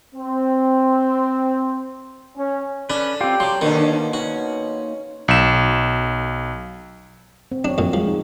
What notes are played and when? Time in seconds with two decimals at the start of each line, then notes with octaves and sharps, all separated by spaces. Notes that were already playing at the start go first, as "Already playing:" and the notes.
0.15 C4
2.37 C#4
2.90 C#4 D4 A4 B4
3.21 C4 F4 G4
3.40 F#3 C6 D6
3.61 B2 D3 D#3 A#3 C#4 D#4 A4 C5
4.13 C#4 F#4
5.28 B1 E7
7.52 C4
7.65 F#3 D4 C#5
7.78 F2 A#2
7.93 F3 G#3
8.07 D#4